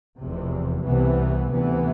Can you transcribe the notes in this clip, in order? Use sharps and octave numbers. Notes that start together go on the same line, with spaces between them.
F1 E2 C3
C2 C3 E3 B3
D2 C3 E3 B3